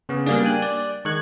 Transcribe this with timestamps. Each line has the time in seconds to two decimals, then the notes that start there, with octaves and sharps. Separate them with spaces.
0.09 C#3 B3
0.26 G3 A#3 D4 G#4
0.43 G5 G#5 F#6
0.62 D5
1.05 D#3 G#3 C#6 F#6 G#6